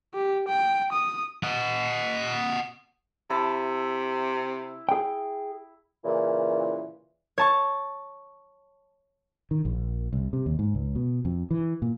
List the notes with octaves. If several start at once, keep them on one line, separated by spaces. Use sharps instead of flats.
G4
G5
D#6
D#5 F#5
C3 E4 A5
G#4 G5
A#2 C#3 E3
C#5 A5 C#6
D#3
A#1
C2
C3
D#2
G#2
C#2
B2
F2
E3
A#2